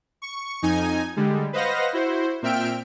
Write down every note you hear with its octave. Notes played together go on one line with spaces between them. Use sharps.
C#6
F2 D#4 G#5
D3 G3 G#3
B4 C5 D#5 F5 F#5 A#6
E4 F#4 C5
A#2 C4 E5 G5 F6 D7